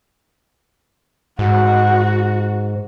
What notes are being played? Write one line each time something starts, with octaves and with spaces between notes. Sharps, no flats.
G#2 F#4